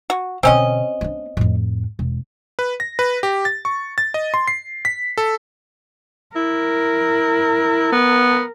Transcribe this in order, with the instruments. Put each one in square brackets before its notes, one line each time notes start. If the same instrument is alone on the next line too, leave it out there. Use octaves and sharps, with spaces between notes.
[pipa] F#4
[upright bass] B2 D3 [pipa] C4 C#4 D#5
[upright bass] B3 D4
F2 A2
E1
[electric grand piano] B4
A#6
B4
G4
A6
C#6
A6
D#5
C6
C7
B6
A4
[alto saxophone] E4 [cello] A#4
[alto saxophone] B3